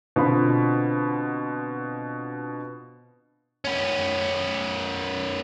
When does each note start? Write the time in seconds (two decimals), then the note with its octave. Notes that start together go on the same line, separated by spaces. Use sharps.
0.16 B2 D3 C4 F4 B5
3.65 B3 C#4